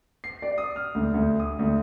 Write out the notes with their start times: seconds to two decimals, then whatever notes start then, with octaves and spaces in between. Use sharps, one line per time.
0.24 C7
0.42 D5
0.58 D#6
0.76 F6
0.95 D2
1.14 D2
1.40 D#6
1.59 D2